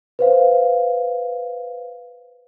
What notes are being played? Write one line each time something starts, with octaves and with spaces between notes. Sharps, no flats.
B4 C5 F5